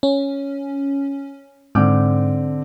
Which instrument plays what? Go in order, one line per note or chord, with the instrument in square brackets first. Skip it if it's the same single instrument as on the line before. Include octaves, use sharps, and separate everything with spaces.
[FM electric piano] C#4
[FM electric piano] G#2 [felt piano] D3 C4 D6